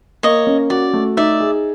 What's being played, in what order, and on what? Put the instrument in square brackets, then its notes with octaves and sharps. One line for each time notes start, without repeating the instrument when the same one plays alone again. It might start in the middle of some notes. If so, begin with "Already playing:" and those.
[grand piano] A#3 [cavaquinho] C#5 D#5
[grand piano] C#4
[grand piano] F#4 [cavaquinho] D5
[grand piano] A3
[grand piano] D#4 [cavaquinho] D5 E5
[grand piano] G#4